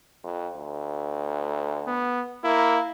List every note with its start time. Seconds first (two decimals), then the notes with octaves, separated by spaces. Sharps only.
0.24 F2
0.55 D2
1.87 B3
2.44 A#3 E4